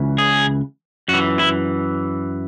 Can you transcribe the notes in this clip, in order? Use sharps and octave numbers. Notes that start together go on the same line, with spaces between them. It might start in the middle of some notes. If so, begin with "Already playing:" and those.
Already playing: C#2 C#3 E3
G#4
F#2 F#4
E3
E4